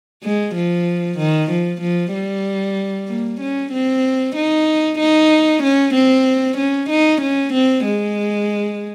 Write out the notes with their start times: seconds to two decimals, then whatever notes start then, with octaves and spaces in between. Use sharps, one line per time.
0.23 G#3
0.55 F3
1.18 D#3
1.50 F3
1.81 F3
2.14 G3
3.08 A#3
3.41 C#4
3.73 C4
4.36 D#4
4.99 D#4
5.63 C#4
5.94 C4
6.57 C#4
6.90 D#4
7.21 C#4
7.53 C4
7.85 G#3